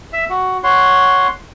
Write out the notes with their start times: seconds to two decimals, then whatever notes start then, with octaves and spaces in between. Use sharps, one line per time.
0.13 E5
0.30 F#4
0.63 C#5 F#5 C6